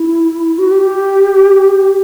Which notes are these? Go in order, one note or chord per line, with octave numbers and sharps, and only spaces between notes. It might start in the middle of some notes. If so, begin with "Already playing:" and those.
Already playing: E4
F#4
G4